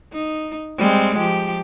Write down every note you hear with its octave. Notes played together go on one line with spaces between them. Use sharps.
D#4
G3 G#3 C4
F3 G4